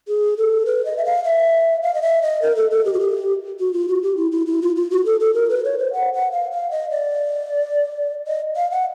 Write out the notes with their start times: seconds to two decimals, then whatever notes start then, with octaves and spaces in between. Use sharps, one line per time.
0.08 G#4
0.37 A4
0.66 B4
0.85 D#5
0.97 E5
1.05 F5
1.24 E5
1.83 F5
1.94 D#5
2.02 E5
2.22 D#5
2.42 A#4
2.56 A4
2.71 A4
2.85 G4
2.93 F#4
3.00 G4
3.60 F#4
3.73 F4
3.88 F#4
4.03 G4
4.17 E4
4.32 E4
4.47 E4
4.62 F4
4.76 F4
4.91 F#4
5.06 A4
5.20 A4
5.34 A#4
5.50 B4
5.64 C#5
5.79 C5
5.93 F#5
6.14 F#5
6.32 F5
6.52 F5
6.71 D#5
6.90 D5
8.27 D#5
8.56 F5
8.71 F#5